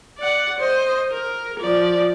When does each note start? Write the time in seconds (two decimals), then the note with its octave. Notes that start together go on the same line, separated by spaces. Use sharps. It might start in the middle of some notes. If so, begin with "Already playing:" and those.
0.18 D5 F#5
0.58 C5 D#5
1.11 A#4
1.60 F3 D5